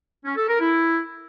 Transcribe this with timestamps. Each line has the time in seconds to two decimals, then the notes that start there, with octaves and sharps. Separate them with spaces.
0.24 C#4
0.36 A4
0.48 A#4
0.60 E4